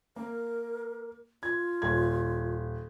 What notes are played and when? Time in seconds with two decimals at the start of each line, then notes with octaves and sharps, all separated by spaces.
0.16 A#3 A#4
1.43 F4 G#6
1.82 D#1 G#6